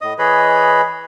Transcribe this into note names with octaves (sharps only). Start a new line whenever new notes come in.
A2 D#5 D#6
E3 G#4 B4 C#5 D#5 B5